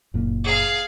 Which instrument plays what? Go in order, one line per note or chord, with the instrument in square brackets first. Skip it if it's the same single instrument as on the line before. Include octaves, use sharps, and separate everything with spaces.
[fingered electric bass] F#1 A#2
[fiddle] G#4 F5